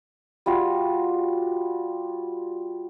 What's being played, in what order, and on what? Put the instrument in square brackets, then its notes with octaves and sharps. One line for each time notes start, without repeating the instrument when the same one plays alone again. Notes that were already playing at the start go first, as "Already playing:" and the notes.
[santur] G3 F4 F#4